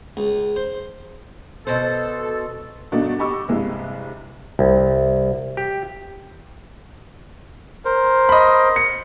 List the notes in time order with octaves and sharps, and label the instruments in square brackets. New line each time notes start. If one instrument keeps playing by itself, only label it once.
[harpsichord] C#2
C5
[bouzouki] B2 C5 [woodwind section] A4
[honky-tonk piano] G2 B2 A3 D4 D#4 F#4
G4 D#5 B5 C#6 D6 E6
C2 G2 C3 G#3
[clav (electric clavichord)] C2
G4
[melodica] A#4 C5
[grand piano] D#5 B5
C#7